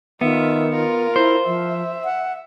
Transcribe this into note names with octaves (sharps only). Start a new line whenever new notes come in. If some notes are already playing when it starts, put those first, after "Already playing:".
D#3 B3 F4 E5
F4 A#4
E4 C5
F3 E5
F#5